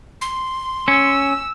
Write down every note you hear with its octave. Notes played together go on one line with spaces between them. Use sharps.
C6
C#4 E6